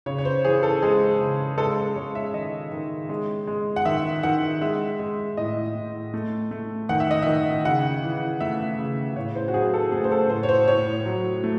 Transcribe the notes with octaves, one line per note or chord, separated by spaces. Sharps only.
C#3 C#5
C#5
C5
E3 G#4
A4
G#3 G#4
C#3
G#3 A4
G#3 C#5
E5
D#3 D#5
D#3
G#3
G#3
F#5
D#3 E5
D#3 F#5
G#3 E5
G#3
A2 D#5
A2
A3
A3
D#3 F#5
E5
D#5
D#3 E5
C#3 F#5
E3
A3 E5
C#3
A2 C#5
C5
F#4
F#3 G#4
A4
A3 G#4
C5
A4
A2 C5
C#5
C5
A2 C#5
F#3
A3